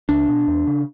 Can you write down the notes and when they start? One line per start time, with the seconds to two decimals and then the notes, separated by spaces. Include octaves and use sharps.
0.09 C#2 D4
0.28 B2
0.48 E2
0.67 C#3